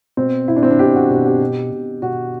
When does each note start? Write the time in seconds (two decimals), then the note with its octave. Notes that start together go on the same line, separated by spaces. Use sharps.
0.17 B2 C4
0.48 B2 E4
0.56 D4
0.63 C4
0.71 D4
0.79 B2 G4
0.94 F#4
1.10 B2 G4
1.26 G4
1.41 B2
1.72 B2
2.02 B2 F#4